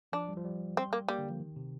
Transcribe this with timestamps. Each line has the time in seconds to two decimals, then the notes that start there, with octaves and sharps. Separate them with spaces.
0.13 F3 D4
0.29 G3
0.37 F3
0.44 G3
0.77 C4
0.93 A#3
1.08 G3 A#3
1.19 D3
1.30 F3
1.40 D#3
1.56 C3